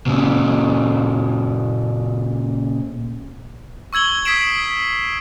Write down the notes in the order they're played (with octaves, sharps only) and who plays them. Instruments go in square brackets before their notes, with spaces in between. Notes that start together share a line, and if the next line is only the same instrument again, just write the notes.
[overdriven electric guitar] A#2 C#3
[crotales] C#6 E6 G#6 F#7 G7
D#6 G#6 B6 C7 D7 E7